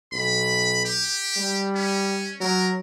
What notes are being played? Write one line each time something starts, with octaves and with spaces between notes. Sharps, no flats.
B1 B5
G4
G3
C#4
F#3 A#4